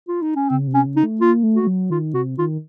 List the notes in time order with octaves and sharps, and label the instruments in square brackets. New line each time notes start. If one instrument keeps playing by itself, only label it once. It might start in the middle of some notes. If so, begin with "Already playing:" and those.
[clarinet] F4
D#4
C#4
[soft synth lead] C#3 [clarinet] C4
[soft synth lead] C3
[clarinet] C#4
[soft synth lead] C#3
[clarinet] D#4
[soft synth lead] A3
[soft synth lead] A#3 [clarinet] F4
[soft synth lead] A3
[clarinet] F#4
[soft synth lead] A3
F#3
[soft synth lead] D#3 [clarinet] F4
[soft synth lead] C3 [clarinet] F#4
[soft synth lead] D#3 [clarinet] F4